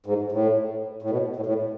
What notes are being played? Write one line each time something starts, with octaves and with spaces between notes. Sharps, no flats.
G#2
A2
A2
B2
A2
A2